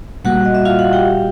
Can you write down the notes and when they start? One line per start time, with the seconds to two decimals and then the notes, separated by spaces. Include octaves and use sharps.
0.24 A#2 G3 A#3 F#4 F#5
0.45 D#5
0.55 E5
0.65 F4 F5
0.79 F#4 F#5
0.93 G4 G5